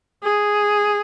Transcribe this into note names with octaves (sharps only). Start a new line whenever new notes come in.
G#4